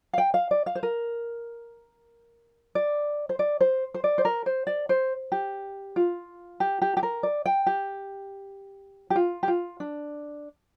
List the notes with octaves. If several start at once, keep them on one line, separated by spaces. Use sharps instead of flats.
F5
G5
F5
D5
F5
C5
A#4
D5
C5
D5
C5
C5
D5
C5
A#4
C5
D5
C5
G4
F4
G4
G4
G4
A#4
D5
G5
G4
G4
F4
G4
F4
D4